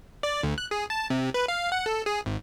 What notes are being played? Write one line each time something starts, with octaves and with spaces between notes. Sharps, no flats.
D5
D2
F#6
G#4
A5
C3
B4
F5
F#5
A4
G#4
G#1